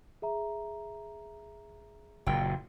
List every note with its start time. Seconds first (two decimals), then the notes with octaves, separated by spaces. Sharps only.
0.22 G#4 E5 A#5
2.26 F#1 A#2 G5